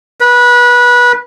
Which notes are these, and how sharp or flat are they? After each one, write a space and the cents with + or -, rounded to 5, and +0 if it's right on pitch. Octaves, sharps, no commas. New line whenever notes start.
B4 -25